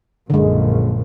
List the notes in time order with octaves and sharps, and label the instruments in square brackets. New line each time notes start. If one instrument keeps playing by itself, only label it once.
[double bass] A#1 F#2 [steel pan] D3 G#3